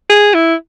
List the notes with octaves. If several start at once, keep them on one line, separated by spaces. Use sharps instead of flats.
G#4
E4